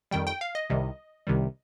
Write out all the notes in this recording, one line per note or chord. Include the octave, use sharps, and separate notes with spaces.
F2 D#3 G3 G5
G5
F5
D#5
C2 C3 D#3 G3
C2 C3 D#3 G3